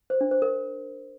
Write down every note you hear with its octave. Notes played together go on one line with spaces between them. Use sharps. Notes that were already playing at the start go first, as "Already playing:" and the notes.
C5
D4
C5
A#4